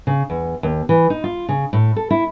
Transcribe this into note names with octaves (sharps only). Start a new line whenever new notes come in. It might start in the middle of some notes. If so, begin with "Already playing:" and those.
C#3
E2
D#2
E3
D#4
F4
C#3
A2
A4
E4